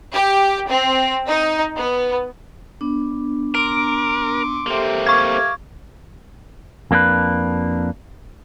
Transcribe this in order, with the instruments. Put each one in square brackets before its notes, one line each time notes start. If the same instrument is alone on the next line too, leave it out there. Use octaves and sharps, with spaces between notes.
[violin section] G4
C4
D#4
B3
[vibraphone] B3 D4
[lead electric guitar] A#4 [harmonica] C6 D6 [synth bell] D7
[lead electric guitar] A#3 C4 [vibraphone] G4 A4 E5
[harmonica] F5 D6 [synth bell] C#6 G#6
[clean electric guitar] F2 A#3 D4 G#4 B4